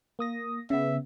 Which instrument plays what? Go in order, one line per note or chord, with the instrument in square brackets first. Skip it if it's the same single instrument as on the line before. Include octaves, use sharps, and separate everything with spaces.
[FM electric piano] A#3 D#6 A#6
[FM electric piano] C#3 B3 [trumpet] E5